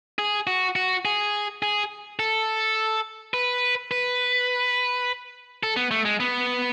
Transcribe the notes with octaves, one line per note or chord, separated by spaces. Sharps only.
G#4
F#4
F#4
G#4
G#4
A4
B4
B4
A4
B3
A3
G#3
B3